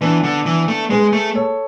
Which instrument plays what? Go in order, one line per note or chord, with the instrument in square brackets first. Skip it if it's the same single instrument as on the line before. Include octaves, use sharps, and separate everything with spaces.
[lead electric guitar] E3 [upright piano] B3 D4
[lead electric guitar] D3
E3
A3
[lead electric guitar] G#3 [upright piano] G#4 B4
[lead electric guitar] A3
[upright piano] A4 C#5